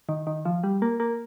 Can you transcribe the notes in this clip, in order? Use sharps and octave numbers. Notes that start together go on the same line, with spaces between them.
D#3
D#3
F3
G3
A#3
A#3